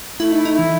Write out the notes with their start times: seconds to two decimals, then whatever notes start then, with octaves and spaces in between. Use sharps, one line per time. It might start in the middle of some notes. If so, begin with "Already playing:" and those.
0.20 A3 E4
0.32 D#4
0.37 E4
0.45 D#4
0.54 E3 E4